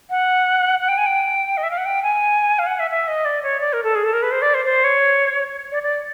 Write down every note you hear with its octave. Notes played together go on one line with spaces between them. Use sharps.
F#5
F#5
G5
G#5
G5
D#5
E5
F5
F#5
G5
G#5
F5
F#5
E5
E5
D#5
D5
C#5
D5
A#4
A4
G#4
A4
A#4
B4
C5
D5
C5
C5
C#5
D5
D5